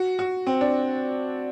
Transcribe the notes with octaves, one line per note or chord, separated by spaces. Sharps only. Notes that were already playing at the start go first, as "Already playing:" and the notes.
Already playing: F#4
F#4
C4
D4